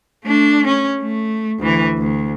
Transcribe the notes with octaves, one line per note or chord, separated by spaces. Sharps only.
A3 D4
C#4
A3
D2 E3
D2